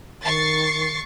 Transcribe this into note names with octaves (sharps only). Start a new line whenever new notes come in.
D#3 C#6 A6 C7